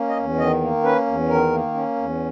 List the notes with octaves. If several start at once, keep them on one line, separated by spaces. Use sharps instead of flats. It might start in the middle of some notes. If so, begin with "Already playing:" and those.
Already playing: A#3 C#4
D#5
E2
D#3 D#5
A#3
C#4 B4
E2
D#3 A#4
A#3
C#4
E2